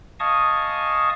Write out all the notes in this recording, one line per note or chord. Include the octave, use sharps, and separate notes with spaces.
D#5 F5 G#5 A5 C#6 D#6